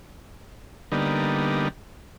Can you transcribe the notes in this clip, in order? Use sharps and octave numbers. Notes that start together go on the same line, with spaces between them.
D3 G3 A#3 B3 D#4